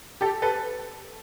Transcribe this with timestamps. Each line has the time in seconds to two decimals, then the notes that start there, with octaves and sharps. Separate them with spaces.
0.21 G4 A4
0.42 A4 B4